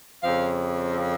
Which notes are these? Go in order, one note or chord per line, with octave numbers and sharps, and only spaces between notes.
F2 C#3 F3 C4 F5